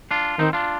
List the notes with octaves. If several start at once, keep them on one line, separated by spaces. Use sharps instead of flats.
D4 F4
D#3 C4 D#4
D4 F4